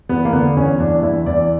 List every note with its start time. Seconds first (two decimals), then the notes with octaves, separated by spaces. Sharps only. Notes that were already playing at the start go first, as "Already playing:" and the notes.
0.09 E2 B3
0.25 A#3
0.33 D3 B3
0.56 E2 C#4
0.80 E2 D4
1.02 E2 E4
1.26 E2 D5